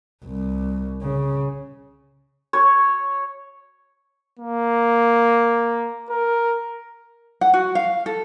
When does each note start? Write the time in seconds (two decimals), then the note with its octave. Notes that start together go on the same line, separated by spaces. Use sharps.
0.24 C2
1.02 C#3
2.53 C#5
4.39 A#3
6.10 A#4
7.41 F#5
7.54 F#4
7.75 F5
8.06 A4